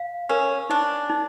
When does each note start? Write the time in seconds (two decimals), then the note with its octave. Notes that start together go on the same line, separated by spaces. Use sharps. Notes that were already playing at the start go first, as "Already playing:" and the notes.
Already playing: F5
0.29 C#4 A#4
0.69 D4 D#4
1.09 D#4